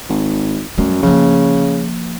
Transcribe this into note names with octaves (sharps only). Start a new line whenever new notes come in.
G#1
F#2 G3 A3
C#3 F3 A#3